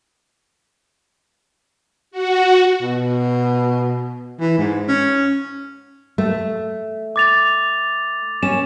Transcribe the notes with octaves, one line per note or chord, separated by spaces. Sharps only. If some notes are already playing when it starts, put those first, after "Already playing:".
F#4
B2
E3
G#2
C#4
A3
D6 A6 F7
C#4 E7